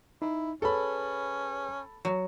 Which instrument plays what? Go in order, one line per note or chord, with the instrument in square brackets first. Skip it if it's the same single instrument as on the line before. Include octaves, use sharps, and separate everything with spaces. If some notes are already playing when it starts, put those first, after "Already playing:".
[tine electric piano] D#4 [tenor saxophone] E4
[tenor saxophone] C#4 [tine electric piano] G#4 B4 C#5 [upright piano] A4 B5
[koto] F#3